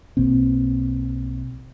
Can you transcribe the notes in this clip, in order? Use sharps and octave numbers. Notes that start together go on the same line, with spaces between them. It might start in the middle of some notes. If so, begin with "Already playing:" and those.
B1 B2 A#3 C4